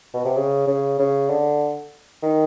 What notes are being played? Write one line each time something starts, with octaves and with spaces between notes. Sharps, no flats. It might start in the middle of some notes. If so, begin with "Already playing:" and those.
B2
C3
C#3
C#3
C#3
D3
D#3